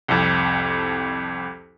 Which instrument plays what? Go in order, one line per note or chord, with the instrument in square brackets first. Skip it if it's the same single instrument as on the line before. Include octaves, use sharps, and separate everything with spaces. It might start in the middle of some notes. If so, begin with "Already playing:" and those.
[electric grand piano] C2 F2